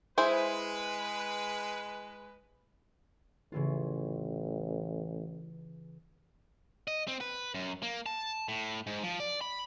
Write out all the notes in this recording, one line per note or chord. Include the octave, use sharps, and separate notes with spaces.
G#3 E4 G#4 B4 C5
A1 C#3 E3 F4
D#5
C4
B4
F#2
A#3
A5
A2
G#2
F3
D5
B5